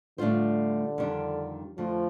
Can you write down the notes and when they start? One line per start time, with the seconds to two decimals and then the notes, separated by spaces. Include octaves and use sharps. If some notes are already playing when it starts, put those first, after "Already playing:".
0.18 A2 D3 G3 D4 F4 C5
0.98 F2 D#3 G3 D4
1.78 F2 D3 F3 A3